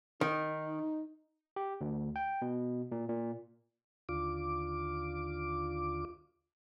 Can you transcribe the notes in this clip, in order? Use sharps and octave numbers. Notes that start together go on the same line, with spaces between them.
D#3 D#4
G4
D2
G5
B2
A#2
A#2
D#2 D3 F4 D6